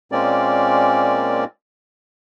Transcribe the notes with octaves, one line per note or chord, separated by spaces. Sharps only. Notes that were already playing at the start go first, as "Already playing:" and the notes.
A#2 G#3 A#3 C4 C#4 D5